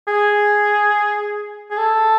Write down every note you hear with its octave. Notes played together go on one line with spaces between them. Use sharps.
G#4
G#4
A4